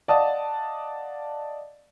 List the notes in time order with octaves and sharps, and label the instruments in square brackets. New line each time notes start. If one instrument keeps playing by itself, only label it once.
[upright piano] D5 D#5 F5 F#5 A5 D#6